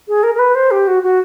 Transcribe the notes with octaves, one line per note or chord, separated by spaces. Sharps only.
G#4
A#4
A#4
B4
C5
G4
F#4
F#4